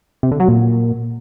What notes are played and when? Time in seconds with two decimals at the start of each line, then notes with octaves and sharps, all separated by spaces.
0.23 C3
0.31 D3
0.40 F#3
0.48 A#2